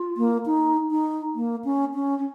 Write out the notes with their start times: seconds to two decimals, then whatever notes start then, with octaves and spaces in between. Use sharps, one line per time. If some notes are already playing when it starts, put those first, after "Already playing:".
Already playing: F4
0.17 A#3
0.46 D#4
0.91 D#4
1.35 A#3
1.64 C#4
1.94 C#4
2.17 C#4